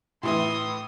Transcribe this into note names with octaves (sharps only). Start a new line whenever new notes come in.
A2 E3 E4 C6 D#6